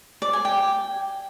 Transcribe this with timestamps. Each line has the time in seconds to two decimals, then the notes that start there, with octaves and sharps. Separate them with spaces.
0.22 D5
0.33 G#5
0.45 G5